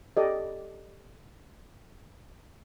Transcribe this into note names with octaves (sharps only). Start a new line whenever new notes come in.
G4 A4 D5 D#5